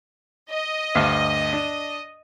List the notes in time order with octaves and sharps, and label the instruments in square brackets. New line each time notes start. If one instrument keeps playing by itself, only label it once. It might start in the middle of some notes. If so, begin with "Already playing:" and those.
[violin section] D#5
[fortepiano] D2 G2 F5
D4